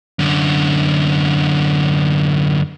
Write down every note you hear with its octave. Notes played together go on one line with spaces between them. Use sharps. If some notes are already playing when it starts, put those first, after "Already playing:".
F#2 D3